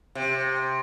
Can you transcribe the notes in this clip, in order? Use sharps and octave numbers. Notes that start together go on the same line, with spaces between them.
C3